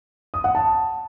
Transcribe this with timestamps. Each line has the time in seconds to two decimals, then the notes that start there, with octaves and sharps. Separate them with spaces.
0.34 D#6
0.44 F#5
0.55 A5